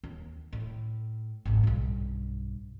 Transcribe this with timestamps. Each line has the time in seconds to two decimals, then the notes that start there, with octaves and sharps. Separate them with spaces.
0.03 D#2
0.52 A2
1.45 G#1 C#2
1.63 B1 G2